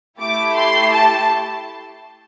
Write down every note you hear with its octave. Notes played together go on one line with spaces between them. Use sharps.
A3 E4 G4 D6
C6
A5